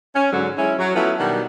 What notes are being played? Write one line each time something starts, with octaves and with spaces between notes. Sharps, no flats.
C#4
G#2 D3 F#3
G#3 C#4 E4
F#3
F#3 A3 B3 C#4 E4 F4
B2 D#3 G3 D4 F#4 F#5